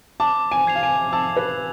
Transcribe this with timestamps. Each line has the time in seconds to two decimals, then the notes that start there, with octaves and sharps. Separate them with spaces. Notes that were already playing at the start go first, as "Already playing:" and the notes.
0.20 A5 D6
0.51 G#5
0.67 G#6 C7 F7
0.75 F5
0.83 G#5
1.13 A5 E6
1.36 B4